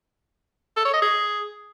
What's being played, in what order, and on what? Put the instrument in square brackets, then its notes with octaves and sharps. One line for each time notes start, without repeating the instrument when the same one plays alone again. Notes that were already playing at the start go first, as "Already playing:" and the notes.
[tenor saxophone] A4
C#5
D#5
G#4